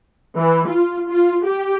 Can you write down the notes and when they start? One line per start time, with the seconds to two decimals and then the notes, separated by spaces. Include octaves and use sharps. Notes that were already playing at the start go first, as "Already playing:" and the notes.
0.37 E3
0.68 F4
1.09 F4
1.45 G4